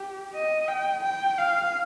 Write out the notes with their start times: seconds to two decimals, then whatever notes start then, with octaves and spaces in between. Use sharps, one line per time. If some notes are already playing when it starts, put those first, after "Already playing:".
Already playing: G4
0.34 D#5
0.68 G5
1.03 G5
1.38 F5